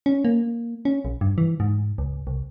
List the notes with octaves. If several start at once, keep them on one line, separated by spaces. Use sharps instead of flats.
C#4
A#3
C#4
A#1
G2
E3
G#2
C#2
C2